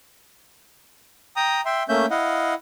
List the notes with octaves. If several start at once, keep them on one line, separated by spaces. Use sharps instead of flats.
G5 A#5 D#6
E5 G5 C6
A3 A#3 C#4 E5 G6
E4 D#5 F5 F#5